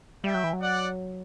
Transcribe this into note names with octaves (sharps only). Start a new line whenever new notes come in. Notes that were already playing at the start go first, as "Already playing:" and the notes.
G3 E5 G5
F#3
E3
F#3
D5 F#5